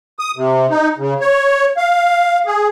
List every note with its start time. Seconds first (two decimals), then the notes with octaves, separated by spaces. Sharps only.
0.19 D#6
0.36 C3
0.70 D#4
0.98 C#3
1.21 C#5
1.77 F5
2.46 G#4